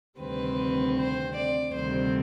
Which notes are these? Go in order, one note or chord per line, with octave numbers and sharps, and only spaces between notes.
D2 C3 D#3 G3 C4 B4
C5
D5
D2 C3 D#3 G3 C4 C5